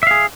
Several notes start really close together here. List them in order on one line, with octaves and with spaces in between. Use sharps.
E5 F5 G#4